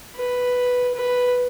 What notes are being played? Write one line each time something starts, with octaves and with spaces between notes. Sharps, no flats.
B4
B4